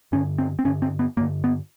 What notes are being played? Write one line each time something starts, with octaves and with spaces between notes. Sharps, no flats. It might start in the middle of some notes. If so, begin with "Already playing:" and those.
G2 D3 C#4
C4
C4
G2 D3 C#4
C4
B3
G2 D3 A#3
B3